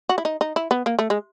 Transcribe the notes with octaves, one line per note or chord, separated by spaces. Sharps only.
F#4
E4
D#4
D#4
E4
B3
A#3
A3
G#3